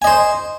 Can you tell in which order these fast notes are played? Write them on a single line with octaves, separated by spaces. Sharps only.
G#5 D#5 C5